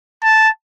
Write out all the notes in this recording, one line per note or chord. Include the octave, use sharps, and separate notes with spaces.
A5